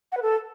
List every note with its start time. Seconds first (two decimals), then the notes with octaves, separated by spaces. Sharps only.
0.12 F#5
0.17 B4
0.22 A4